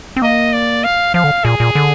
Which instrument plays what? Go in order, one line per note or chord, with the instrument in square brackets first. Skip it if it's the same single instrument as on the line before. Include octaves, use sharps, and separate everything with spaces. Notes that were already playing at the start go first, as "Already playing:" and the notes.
[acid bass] C4
[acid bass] A#3 [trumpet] D#5
[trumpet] D5
F5
[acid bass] F3 [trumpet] F5
[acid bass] D3
[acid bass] A#2 [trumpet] G#4
[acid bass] A#2
D3